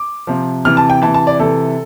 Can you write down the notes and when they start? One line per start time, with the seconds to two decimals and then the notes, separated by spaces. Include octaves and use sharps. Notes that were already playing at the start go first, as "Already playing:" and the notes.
Already playing: D6
0.27 C3 F3
0.65 C3 E3 F6
0.77 A5
0.90 G5
1.02 E3 A5
1.07 C3
1.14 A5
1.27 D5
1.39 C3 E3 A4